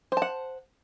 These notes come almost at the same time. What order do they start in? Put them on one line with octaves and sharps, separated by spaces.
C5 A5 F#5